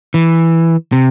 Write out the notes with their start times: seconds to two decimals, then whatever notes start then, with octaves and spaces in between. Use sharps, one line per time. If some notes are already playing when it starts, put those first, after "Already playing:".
0.14 E3
0.92 C3